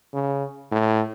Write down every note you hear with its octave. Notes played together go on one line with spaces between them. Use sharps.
C#3
A2